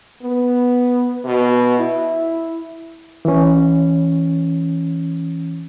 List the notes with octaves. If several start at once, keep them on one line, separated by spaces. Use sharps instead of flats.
B3
B2
E4
E3 C#4